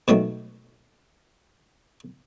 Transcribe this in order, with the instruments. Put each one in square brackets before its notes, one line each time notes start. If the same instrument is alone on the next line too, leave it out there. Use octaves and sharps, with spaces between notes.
[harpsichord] B2 D#3 F#3 A3